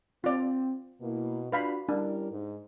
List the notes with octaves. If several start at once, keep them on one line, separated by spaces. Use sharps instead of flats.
C4 F4 D5
B2 A#3 E4
D4 F4 F#4 B4 F5 B5
G3 C#4 D4 E4 A#4
G#2 D#4